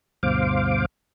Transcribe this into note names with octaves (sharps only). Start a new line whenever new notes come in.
D2 G2 B2 C5 F5 D6